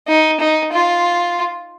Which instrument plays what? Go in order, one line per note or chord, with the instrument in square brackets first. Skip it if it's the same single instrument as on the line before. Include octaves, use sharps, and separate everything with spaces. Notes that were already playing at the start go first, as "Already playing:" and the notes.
[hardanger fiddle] D#4
D#4
F4